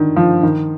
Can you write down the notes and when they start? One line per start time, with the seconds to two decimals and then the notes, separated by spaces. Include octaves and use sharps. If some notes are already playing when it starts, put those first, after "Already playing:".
Already playing: D3 D#3
0.16 F3
0.43 D#3